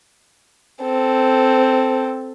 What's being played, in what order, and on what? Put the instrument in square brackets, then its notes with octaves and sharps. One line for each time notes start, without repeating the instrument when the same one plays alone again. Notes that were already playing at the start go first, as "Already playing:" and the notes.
[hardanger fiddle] C4 A4